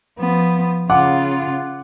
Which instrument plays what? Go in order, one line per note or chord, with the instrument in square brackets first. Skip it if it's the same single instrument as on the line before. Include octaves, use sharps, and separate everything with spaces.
[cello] F3 B3
[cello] C#3 F4 [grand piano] F#5 D6